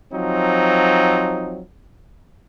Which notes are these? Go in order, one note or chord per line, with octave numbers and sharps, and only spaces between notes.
F3 F#3 C4 D#4